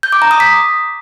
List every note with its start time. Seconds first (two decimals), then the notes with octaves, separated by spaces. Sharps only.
0.03 G6
0.12 D6
0.22 A#5
0.31 D#6
0.40 B6